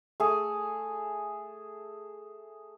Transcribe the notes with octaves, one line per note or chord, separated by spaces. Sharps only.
A3 G#4